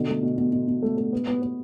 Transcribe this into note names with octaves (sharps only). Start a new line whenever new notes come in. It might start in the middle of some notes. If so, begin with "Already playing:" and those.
Already playing: B2 D3
A3
B2
B2
B2
B2
A3
A3
B3
B3
B3